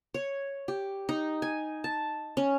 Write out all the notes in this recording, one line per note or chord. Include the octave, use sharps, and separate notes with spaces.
C#5
G4
D#4
G#5
A5
C#4